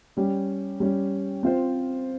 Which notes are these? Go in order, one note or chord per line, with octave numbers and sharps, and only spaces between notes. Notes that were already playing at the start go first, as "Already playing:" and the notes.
G3 C#4 G4
G3 C#4 G4
C4 F4 C5